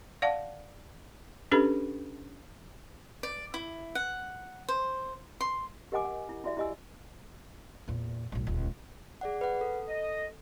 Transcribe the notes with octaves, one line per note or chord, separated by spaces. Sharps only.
D5 F5 F#5 A5
C#4 D4 G4 A4 B4 B5
D5
E4
F#5
C5
C6
G4 A#4 D#5 F#5 G#5 D6
F#5
E4
E4 F#4 D5 E5
E4 G4 D#5 G#5 E6
E2 A#2
B1 A2
D#1 C#2
G#4 D5 F#5
B4 F#5
A4
D#5